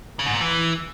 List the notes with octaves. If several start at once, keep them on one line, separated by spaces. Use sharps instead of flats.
C#3
G#2
A#2
E3